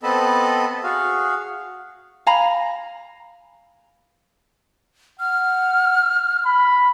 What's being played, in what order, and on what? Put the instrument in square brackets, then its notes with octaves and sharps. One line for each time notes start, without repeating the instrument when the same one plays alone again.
[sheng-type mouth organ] B3 C4 A4 D#5 A5 B5
F#4 G#4 F5
[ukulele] F5 G#5 A#5 B5
[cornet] F#5 [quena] F6
[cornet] B5